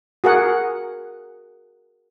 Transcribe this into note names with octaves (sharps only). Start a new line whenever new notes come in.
F#4 G#4 A#4 F#5